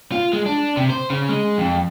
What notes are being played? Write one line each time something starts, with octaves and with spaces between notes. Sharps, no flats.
F4
G#3
D4
C3
C5
C#3
G#3
F2